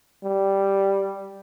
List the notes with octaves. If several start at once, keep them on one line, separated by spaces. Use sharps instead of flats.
G3